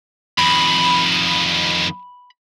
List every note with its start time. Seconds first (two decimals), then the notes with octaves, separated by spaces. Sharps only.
0.38 F2 D#3 B5